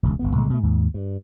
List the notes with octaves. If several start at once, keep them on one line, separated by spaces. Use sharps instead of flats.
E1 C#2
G1 D2 B3
C2 A#2 D3 G#3
B2 A3
D#2 G#2
G2